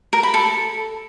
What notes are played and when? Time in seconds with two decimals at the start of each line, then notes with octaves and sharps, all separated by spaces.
0.13 A#4
0.23 B5
0.34 A4